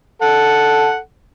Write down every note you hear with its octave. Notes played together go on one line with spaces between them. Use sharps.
A4 F#5